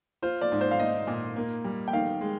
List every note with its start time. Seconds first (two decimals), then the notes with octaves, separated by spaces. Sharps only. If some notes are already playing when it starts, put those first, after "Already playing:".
0.22 F4 C5
0.41 D5
0.52 G#2
0.61 C5
0.71 F5
0.79 D#4 D#5
1.07 A#2
1.36 A#3
1.64 G3
1.88 G5
1.93 D#3 F5
2.21 G#3